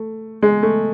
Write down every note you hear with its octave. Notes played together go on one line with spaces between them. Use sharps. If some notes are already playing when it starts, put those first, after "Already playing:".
Already playing: A3
G#3
A3